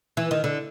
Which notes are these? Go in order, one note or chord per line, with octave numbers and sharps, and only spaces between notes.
E3
D#3
D3